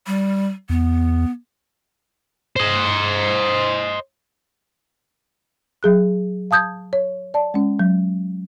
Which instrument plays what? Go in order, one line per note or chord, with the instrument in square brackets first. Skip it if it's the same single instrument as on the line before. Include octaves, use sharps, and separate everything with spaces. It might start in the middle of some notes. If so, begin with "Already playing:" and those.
[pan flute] G3
[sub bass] E2 [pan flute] B3
[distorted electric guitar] C5 D#5
[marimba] F#3 G#4 F#6
F5 A5 D#6 G6 G#6
C#5
D5 A5
G#3 C#4
F#3